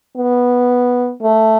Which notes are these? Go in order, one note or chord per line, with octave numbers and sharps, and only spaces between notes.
B3
A3